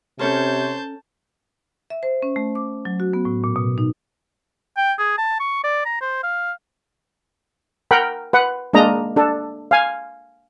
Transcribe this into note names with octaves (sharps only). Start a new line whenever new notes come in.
C3 C#4 A4 A#4 C5 C#5 A5 G6
E5
C5
C#4
A3
D6
F#3
F#4
B3
A2
A#2
B2
D#4
G5
G#4
A5
C#6
D5
A#5
C5
F5
A#4 F#5 G5 B5
B4 F#5
G#3 A#3 D4 D#5 A#5
D4 A4
F5 G#5